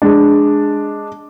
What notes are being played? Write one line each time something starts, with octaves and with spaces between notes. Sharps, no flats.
G#3 D4